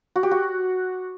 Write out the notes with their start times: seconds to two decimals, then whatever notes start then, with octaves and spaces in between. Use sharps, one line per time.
0.16 F#4
0.23 G4
0.31 F#4